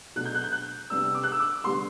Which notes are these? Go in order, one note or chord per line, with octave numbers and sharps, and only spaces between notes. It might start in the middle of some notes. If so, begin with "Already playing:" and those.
B2 F#3 A3 D4 F#6
G6
F#6
G6
F#6
C3 G3 B3 D4 E6
E6
D6
F#6
E6
D6
D3 G3 B3 C6